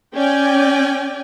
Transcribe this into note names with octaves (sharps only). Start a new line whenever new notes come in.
C#4 D5 G5 G#5